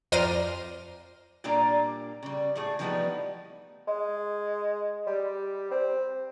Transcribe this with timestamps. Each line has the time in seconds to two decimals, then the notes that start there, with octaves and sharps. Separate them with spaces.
0.12 F2 C5 D5 A#5 F6 D#7
1.44 A#2 G3 A#3 D4 D5 A#5
2.23 C#3 G3
2.55 A2 A3 G#4
2.79 E3 F3 G3 A3 B3 D#4
3.87 G#3
5.07 G3
5.71 C4